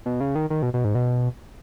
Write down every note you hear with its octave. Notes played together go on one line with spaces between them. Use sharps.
B2
C#3
D#3
D#3
B2
B2
G#2
B2